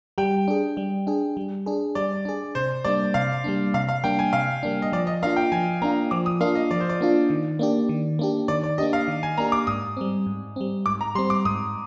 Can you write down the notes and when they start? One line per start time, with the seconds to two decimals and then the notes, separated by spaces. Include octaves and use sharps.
0.18 G3 G5
0.48 D4 G#4
0.77 G3
1.07 D4 G#4
1.37 G3
1.66 D4 G#4
1.95 G3 D5
2.25 D4 G#4
2.55 C3 C5
2.85 G3 A#3 D4 D5
3.14 C3 F5
3.44 G3 A#3 D4
3.74 C3 F5
3.89 F5
4.04 G3 A#3 D4 G5
4.19 G#5
4.33 C3 F5
4.63 G3 A#3 D4
4.82 D#5
4.93 F3 D5
5.07 D#5
5.22 A#3 D4 F4 F5
5.37 G5
5.52 F3 G#5
5.82 A#3 D4 F4 A#5
6.11 F3 D6
6.26 D#6
6.41 A#3 D4 F4 F5
6.55 D#5
6.71 F3 D5
6.80 C5
6.89 D5
7.01 A#3 D4 F4
7.30 D#3
7.59 A#3 D4 G4
7.89 D#3
8.19 A#3 D4 G4
8.48 D#3 D5
8.64 D5
8.78 A#3 D4 G4 D#5
8.93 F5
9.08 D#3
9.23 G#5
9.38 A#3 D4 G4 A#5
9.52 D6
9.67 G#2 D#6
9.97 G3 C4
10.26 G#2
10.56 G3 C4
10.86 G#2 D6
11.01 A#5
11.15 G3 C6
11.18 C4
11.30 D6
11.45 G#2 D#6